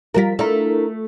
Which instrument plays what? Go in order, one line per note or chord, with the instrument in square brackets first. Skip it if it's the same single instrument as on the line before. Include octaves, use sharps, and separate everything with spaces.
[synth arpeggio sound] F3 G3 B6 [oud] F4 F#4 A#4
[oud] A3 [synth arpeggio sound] D4 E4 A#4